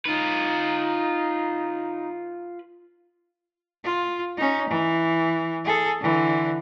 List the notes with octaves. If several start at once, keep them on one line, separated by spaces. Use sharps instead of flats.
D#4 F4 B4
F4
C#4 D#4
E3
G#4 A4
D3 E3